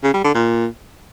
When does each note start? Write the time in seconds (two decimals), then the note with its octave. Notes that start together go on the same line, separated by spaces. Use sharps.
0.03 C#3
0.14 G3
0.24 D3
0.35 A#2